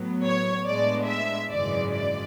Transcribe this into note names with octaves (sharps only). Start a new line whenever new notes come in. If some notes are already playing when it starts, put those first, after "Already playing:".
Already playing: A2 F#3 B3
C#5
A2 G#3 B3 D4 D5
E5
G#1 F#2 C#3 E3 G#3 D5
D5